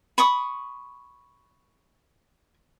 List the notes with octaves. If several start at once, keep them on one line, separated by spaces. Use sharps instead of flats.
B5 C#6 D#6